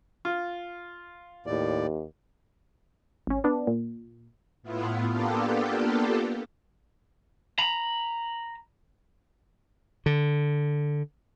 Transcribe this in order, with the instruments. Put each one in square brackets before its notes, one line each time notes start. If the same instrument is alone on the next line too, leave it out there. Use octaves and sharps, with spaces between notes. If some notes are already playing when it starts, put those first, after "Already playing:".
[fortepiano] F4
[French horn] D#2 [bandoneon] A2 D5
[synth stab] G#1 C#4
B3 D4
A#2
[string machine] A2 B3 E4 F4
A#3 B3 D4 F4 G4 A4
[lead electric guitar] A#5 B5
[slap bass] D3